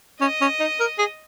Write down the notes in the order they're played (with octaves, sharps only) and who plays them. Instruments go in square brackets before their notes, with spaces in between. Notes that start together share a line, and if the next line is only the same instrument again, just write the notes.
[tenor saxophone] C#4 [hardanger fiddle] D#5
[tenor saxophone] C#4
D#4
A#4
G#4